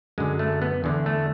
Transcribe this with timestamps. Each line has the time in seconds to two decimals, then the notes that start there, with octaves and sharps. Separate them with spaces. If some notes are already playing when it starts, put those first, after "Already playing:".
0.18 F#2 D3 G#3
0.39 A3
0.62 B3
0.84 E2 D3
1.06 A3